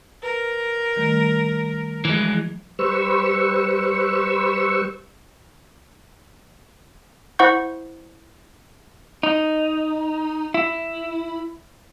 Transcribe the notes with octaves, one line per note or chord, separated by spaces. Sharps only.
A#4 B4
D#3 G3 A3
E3 F3 G#3
G3 B4 C5 C#6 E6
E4 C5 F#5 C#6 G6
D#4
E4